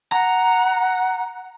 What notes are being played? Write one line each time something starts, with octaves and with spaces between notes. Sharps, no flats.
F#5 A#5